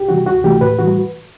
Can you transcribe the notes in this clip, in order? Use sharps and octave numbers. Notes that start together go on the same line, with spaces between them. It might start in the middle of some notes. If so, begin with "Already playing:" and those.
Already playing: C2 G4
C3 E3 G3 F#4
D2 F#4
C3 E3 A3 G4
A2 B4
E3 G3 F#4